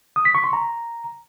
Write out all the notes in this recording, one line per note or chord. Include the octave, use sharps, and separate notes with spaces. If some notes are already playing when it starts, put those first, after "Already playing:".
D#6
B6
C#6
C6
A#5